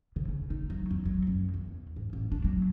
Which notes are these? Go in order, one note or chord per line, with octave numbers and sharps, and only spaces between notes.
C#3
C#3
D#4
F#3
E2
F#3
F#2
E2
G#2
A1
D4
F#3